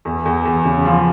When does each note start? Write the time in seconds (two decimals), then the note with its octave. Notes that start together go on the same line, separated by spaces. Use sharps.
0.05 E2
0.25 E2
0.45 E2
0.65 C#3
0.85 F3